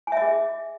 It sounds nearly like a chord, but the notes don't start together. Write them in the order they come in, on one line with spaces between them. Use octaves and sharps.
G#5 E5 D#5 G#4